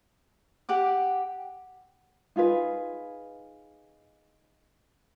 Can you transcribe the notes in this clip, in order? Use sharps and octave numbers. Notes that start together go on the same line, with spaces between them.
G4 F#5 D6
D#4 F4 G#4 B4